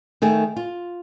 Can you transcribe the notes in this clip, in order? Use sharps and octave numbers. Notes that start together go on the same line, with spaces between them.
D#3 A3 G#4
F4